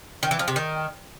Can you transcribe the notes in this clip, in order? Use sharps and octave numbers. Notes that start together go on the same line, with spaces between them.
D#3
E3
F3
C3
D#3